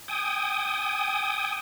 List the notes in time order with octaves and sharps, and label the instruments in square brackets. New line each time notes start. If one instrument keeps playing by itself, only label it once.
[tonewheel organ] G5 G#5 D#6